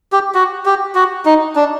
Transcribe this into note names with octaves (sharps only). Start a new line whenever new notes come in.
G4
F#4
G4
F#4
D#4
D4